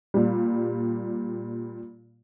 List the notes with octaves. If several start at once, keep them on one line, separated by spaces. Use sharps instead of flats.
A#2 G3